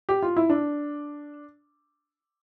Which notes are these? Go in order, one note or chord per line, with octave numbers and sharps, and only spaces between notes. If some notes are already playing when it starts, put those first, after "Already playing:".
G4
F4
E4
D4